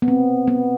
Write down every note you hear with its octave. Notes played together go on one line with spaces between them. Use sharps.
B3
C4
B3